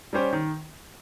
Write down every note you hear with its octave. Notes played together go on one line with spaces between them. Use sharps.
G3 C#4 G4 C5
D#3